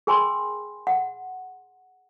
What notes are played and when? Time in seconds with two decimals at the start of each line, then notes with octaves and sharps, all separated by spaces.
0.07 G#4 A#4 G5 G#5 B5 C6
0.87 F#5